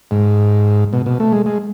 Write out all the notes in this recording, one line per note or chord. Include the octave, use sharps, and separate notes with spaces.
G#2
B2
B2
A3
G#3
G#3